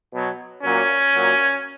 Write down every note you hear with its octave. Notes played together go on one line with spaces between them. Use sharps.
B2 F#3
A#2 F#3 C#4
A#2 F#3